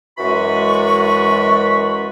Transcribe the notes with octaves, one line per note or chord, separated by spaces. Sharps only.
F#2 E3 G#3 F#4 B5 C#6